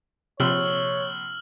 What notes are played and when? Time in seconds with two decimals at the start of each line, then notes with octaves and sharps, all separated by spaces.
0.40 A#1 C3 C#5 C6 E6 F6 F#7